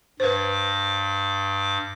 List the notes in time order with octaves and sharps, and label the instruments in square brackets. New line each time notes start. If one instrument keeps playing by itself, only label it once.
[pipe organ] G2 D6 [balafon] B4 C5